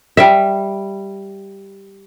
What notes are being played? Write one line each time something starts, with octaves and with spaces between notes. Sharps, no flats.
G3 E5